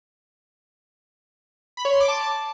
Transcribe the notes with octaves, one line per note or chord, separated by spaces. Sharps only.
B5
C#5
C6
D6
A5